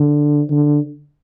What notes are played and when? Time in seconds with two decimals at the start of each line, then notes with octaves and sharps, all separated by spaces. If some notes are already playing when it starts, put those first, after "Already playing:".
Already playing: D3
0.51 D3